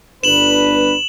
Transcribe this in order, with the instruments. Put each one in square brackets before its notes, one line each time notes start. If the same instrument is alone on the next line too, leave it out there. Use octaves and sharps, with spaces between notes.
[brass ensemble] G1 D4 B4 [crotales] E7 F#7